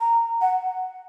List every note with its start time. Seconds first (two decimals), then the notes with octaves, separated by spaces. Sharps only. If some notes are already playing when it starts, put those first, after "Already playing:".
0.01 A#5
0.41 F#5